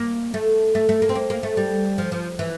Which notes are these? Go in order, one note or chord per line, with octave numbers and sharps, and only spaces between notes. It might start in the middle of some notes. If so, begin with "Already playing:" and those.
Already playing: A#3
A3
A3
A3
A#3
C4
A#3
A#3
A3
G3
F3
F3
E3